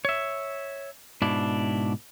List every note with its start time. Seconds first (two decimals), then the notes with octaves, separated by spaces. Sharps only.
0.05 C#5 E5
1.22 G#2 B2 D4 E4